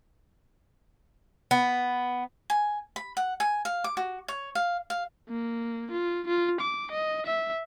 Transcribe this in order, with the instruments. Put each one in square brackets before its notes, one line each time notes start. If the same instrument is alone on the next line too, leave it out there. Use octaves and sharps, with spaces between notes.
[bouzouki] B3
[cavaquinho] G#5
B5
F#5
G#5
F5
D6
F#4
C#5
F5
F5
[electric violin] A#3
F4
F4
D6
D#5
E5